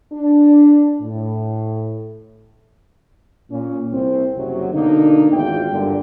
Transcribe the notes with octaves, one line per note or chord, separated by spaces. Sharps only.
D4
A2
A#2 C#4
C2 C4
F#1 C3 F#3
B2 D3 A#3 D4 D#4
G#1 E2 F4 G5
G2 A#2 D3